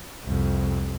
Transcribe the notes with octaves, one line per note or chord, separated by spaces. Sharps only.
C2 F2